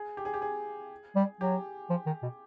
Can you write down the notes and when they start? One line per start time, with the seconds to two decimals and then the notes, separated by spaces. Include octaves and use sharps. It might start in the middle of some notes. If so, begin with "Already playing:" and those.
Already playing: G#4
0.17 G4
0.25 G#4
0.34 G4
0.42 G#4
1.16 G3
1.41 F#3 G4
1.90 F3
2.06 D#3
2.23 B2